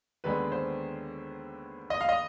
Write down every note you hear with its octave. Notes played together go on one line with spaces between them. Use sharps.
D#2 D3 G#3 B3 B4
C5
D#5
F5
D#5